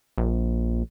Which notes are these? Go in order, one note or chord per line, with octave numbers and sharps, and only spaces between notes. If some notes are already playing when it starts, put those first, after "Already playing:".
A#1